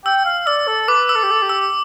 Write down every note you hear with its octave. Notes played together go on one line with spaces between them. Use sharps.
G5 E6
F5
D5 E6
A4
B4 D6
E6
A4
G4
A4
G4
E6